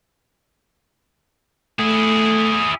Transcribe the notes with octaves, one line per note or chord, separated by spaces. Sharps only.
A3 E4 G#4